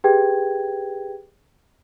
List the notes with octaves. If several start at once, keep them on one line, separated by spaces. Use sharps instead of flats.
G4 G#4 B4 G5 G#6